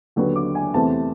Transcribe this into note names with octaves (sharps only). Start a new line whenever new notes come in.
D#2 D3 F#3 B3
D6
G#5
E2 C3 E3 A3 C4 A5